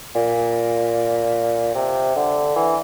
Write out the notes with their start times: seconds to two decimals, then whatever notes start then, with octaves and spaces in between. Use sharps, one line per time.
0.15 A#2
1.75 C3
2.16 D3
2.56 E3